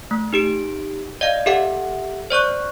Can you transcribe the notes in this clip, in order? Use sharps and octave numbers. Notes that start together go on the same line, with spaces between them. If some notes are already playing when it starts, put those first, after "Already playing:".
A3
D#4 G4 D7
D5 D#5 F5
G4 A4 E5 F#5
C5 D5 C#6 F#6